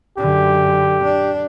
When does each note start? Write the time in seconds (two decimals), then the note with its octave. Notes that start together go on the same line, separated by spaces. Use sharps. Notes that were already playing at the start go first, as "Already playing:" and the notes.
0.18 F#2 D3 G4
1.04 D4